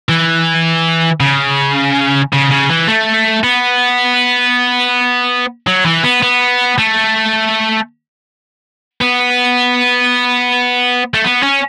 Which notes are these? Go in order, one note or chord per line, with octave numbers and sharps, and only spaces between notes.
E3
C#3
C#3
C#3
E3
A3
B3
F#3
E3
B3
B3
A3
B3
A3
B3
C#4